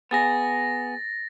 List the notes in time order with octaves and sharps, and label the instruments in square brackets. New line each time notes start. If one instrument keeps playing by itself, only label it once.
[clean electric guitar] B3 G#4 [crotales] A6 A#6